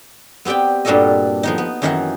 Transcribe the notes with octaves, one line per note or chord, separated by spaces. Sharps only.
B3 C4 G4 D5 G5
G2 A#2 G3 F#4 A4 D#5
F3 B3 D#4
B3
F#2 D#3 E3 D#4 A#4 F#5